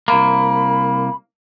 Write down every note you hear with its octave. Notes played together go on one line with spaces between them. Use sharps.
C2 A#3 B5